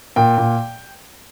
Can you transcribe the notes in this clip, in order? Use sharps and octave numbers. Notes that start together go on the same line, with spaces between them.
A#2 G5
A#2